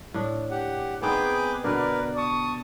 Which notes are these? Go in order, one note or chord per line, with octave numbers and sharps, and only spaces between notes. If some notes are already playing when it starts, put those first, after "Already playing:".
A2 D4
G4 F#5
B3 C4 D#4 G#4 B4 G5 D6
B2 D3 A#4 B4 D5
A5 C#6 D#6